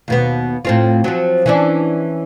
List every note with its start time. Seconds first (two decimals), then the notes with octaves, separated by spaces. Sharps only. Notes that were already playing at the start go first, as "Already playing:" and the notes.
0.08 D#2 B2 B3
0.65 A2 C4 F4
1.04 F3 F#3
1.46 E3 C#4 D4